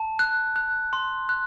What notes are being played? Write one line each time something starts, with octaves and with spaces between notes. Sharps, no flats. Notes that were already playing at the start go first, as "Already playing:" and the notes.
Already playing: A5
F#6
F#6
C6
F#6